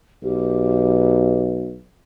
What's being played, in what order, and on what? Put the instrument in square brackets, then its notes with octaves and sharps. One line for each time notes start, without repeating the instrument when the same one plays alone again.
[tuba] B1 [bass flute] G4